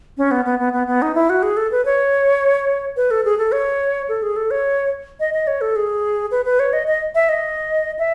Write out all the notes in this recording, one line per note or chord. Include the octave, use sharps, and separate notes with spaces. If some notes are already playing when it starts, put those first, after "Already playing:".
C#4
B3
B3
B3
B3
B3
D#4
E4
F#4
G#4
A4
B4
C#5
B4
A4
G#4
A4
C#5
A4
G#4
A4
C#5
D#5
D#5
C#5
A4
G#4
B4
B4
C#5
D#5
D#5
E5
D#5
E5